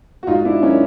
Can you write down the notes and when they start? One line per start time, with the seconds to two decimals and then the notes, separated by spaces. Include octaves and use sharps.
0.23 F#4
0.27 G#2 D#4 F4
0.45 D4 E4
0.62 D#3 F#3 C#4 D#4